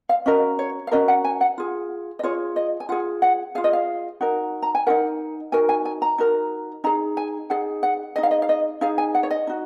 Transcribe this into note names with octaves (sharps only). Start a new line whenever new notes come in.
F5
C#4 F#4 A#4 D#5
C#5
F5
C#4 F#4 A#4 D#5
F#5
G#5
F#5
F4 G#4
D#5
F4 G#4 C#5
D#5
G#5
F4 G#4 F#5
F#5
F4 G#4 F5
D#5
F5
D#4 F#4 A#4
A#5
G#5
D#4 F#4 A#4 F#5
D#4 F#4 A#4 G#5
G#5
G#5
A#5
D#4 F#4 A#4
D#4 G#4 A#5
G#5
D#4 G#4 F#5
F#5
D#4 G#4 D#5
F5
D#5
F5
D#5
D#4 G#4 F5
G#5
F#5
C#5
D#5
D#4 F#4